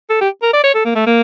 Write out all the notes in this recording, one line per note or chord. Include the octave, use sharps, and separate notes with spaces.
A4
G4
A#4
D5
C#5
A4
A#3
A3
A#3